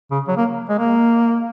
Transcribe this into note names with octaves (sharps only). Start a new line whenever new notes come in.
C#3
F#3
A#3
G#3
A#3